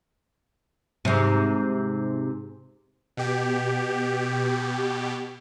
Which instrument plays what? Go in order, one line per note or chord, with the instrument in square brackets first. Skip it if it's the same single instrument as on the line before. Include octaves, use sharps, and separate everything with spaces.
[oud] G#2 C3
[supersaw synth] B2 G4